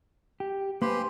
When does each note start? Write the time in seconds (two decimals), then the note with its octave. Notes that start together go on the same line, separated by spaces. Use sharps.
0.40 G4
0.82 A#3 G4 B4 C5 G#5 C6